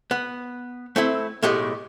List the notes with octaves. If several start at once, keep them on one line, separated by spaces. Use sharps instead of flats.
B3
A3 C4 E4
B1 A2 G#3 A3 G4 D#5